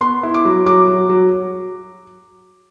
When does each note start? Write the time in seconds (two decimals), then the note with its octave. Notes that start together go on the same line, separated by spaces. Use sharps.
0.01 B3 C6
0.23 E4
0.34 D6
0.45 F#3
0.66 F#3 D6
0.88 F#3
1.09 F#3